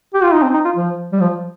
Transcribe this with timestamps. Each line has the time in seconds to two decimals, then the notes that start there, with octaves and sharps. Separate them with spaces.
0.14 G4
0.23 F4
0.33 D#4
0.43 C4
0.54 D#4
0.65 F4
0.76 F3
1.13 G3
1.20 F3